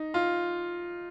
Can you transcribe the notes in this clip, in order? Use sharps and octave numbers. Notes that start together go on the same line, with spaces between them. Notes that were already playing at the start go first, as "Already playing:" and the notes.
Already playing: D#4
F4